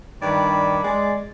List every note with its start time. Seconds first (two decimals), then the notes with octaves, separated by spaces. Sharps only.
0.22 G2 D#3 D4 D5 B5
0.84 G#3 D5